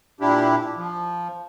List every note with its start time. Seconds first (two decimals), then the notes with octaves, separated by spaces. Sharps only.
0.20 A#2 D4 E4 G4
0.77 F3